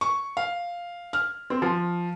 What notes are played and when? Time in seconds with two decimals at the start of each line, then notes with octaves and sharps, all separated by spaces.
0.01 C#6
0.37 F5
1.13 F6
1.50 C4
1.62 F3